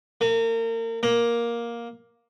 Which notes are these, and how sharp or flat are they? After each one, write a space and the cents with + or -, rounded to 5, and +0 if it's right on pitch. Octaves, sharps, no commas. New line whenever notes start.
A#3 -35
A#3 +10